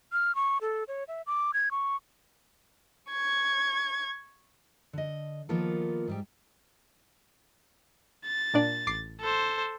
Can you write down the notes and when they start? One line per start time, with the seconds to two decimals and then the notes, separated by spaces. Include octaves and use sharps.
0.12 F6
0.35 C#6
0.61 A4
0.88 C#5
1.08 E5
1.27 D6
1.54 G#6
1.71 C#6
3.10 C#6 G#6
4.93 D3 D#5
5.49 D#3 F3 A#3 B3 F4 A4
6.08 G#2 G3 G4
8.25 A6
8.54 A#2 D4 D5
8.87 A1 D6 C7
9.21 A4 C5